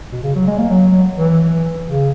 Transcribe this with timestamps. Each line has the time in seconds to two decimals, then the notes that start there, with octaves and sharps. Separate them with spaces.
0.12 B2
0.23 C#3
0.35 F#3
0.47 G#3
0.58 A#3
0.70 F#3
1.17 E3
1.87 C#3